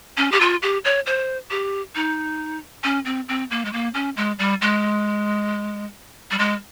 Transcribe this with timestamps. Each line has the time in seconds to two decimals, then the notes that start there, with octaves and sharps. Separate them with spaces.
0.17 C#4
0.32 G4
0.40 F4
0.62 G4
0.84 C#5
1.06 C5
1.51 G4
1.95 D#4
2.84 C#4
3.05 C4
3.28 C4
3.51 A#3
3.65 G#3
3.73 A#3
3.94 C#4
4.17 G#3
4.39 G3
4.62 G#3
6.31 G3
6.39 G#3